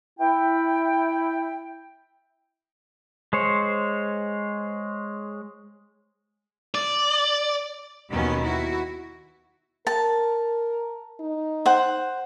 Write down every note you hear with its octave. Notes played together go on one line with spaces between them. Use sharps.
E4 G5
G#3 C5 C#5
D5
D#2 B2 D#3 F#3 B3 C#4
E4 F#4
A#4 A5
D#4
C5 F#5